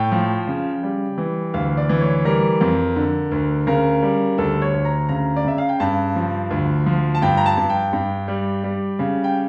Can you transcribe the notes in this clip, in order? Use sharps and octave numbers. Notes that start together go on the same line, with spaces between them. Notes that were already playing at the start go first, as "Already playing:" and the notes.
Already playing: A2 G5
F3
C#3
G3
E3
D2 F5
D5
E3
C#5
G3 A#4
F2
D3
D2
C#3 A#4
G3
D2 A4
C#5
D2
A#5
C#3 A#5
D5
C#3 E5
F5
G5
G2 A5
F3
D2
F3
A5
G2 G5
A#5
A5
G2
G5
G2
G3
G3
C#3
G5